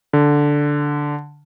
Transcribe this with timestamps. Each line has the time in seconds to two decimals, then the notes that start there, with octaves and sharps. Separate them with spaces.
0.13 D3